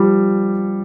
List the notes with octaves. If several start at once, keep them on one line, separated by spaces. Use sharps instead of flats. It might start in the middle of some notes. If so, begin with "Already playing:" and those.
Already playing: F3 G3